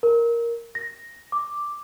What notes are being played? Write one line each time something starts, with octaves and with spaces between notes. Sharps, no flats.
A#4
A#6
D6